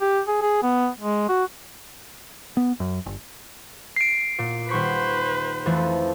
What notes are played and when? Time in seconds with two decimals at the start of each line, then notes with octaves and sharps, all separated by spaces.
0.01 G4
0.28 G#4
0.42 G#4
0.63 B3
1.00 G#3
1.29 F#4
2.57 B3
2.80 F#2
3.06 G1
3.96 C7 D7
4.38 A#2
4.69 D#1 B4 C5 C#6 B6
5.66 F2 E3 A3